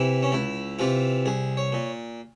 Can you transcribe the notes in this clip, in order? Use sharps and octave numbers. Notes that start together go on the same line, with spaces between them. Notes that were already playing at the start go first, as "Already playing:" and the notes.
Already playing: C3 E3 E4
C#4
C#2 E4
C3 E3 F4
C2 G#4
C#5
A#2